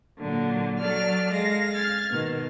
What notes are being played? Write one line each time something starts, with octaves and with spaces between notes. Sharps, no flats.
A#2 D3 F#3
F#3 A4 D5 F6
G#3 F5 A#6
F6 G#6 A6
B2 D#3